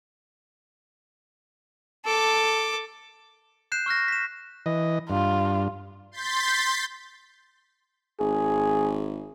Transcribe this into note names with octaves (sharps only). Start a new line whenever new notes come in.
A4 D6
F#6 G6 C7 E7
C#6 F6 F#6 A#6
B6 E7
E3 D#5
G2 F4
C6 G6 A6 B6
G#1 G#4